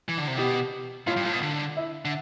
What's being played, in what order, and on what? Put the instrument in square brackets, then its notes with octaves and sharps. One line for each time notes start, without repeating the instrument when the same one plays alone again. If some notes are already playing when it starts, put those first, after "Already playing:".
[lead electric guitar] E3
D3
C3
[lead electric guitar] B2 [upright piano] G4
[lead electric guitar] A2 [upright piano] F4
[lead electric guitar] G2
A2
B2
D3
[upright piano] E4
[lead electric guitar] D3